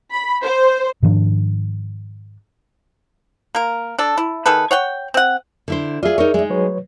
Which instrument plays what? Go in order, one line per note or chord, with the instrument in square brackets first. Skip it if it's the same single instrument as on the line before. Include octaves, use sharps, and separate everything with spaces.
[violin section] B5
C5
[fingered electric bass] G#2 D#3 F3 D4
[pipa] A#3 A#4
D4 A4
E4
D#3 G#4 A4 B4
C#5 F#5 G5
C4 F#5
[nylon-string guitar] D3 E4 C5
[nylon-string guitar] F4 G#4 [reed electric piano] D5 E5
[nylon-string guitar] D#4 A#4 C#5
G#3 D#4
[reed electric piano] F#3 B4 C#5